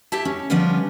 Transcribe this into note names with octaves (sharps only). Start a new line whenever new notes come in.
E4 G4 A4 E5 A5
C#4
D3 F3 G3 B3 C#4 D4